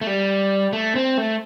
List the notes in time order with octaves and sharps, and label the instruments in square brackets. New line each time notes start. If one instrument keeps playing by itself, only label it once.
[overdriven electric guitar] A3
G3
A3
C4
A3